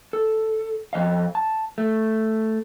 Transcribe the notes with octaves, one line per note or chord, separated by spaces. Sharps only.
A4
F2 F3 D#5 F5
A5
A3